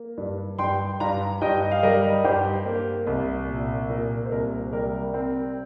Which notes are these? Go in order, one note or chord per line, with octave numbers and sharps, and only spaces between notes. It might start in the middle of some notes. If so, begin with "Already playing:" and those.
Already playing: A#3
G2
G2 G5 C6
G2 F5 A#5
G2 D#5 G5
F5
G3 A#4 D#5
G2 G4 C5
A#3
C2
A#2
A#2 A#4
C5
C2 A#4
G3 A#4
C4